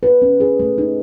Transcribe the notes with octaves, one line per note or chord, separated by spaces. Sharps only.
B4
C#4
G#4
A3
D#4